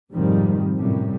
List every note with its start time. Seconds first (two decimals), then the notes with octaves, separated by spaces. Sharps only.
0.13 F1 G#2 D#3 F3 G3 C4
0.78 F#2 A2 C3 G3